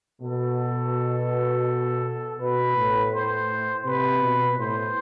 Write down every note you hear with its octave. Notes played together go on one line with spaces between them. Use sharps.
B2 A4
B2 B4
A2
C5
C3 B4
B2
A2 C5